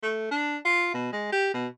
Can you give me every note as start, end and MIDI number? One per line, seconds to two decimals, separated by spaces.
0.03 0.30 57
0.32 0.58 62
0.65 0.91 65
0.94 1.13 47
1.13 1.29 56
1.33 1.53 67
1.54 1.67 47